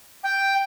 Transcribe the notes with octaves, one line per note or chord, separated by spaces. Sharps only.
G5